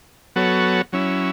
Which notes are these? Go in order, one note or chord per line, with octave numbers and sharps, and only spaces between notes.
F#3 B3 F#4 A4 C#5
F#3 C#4 E4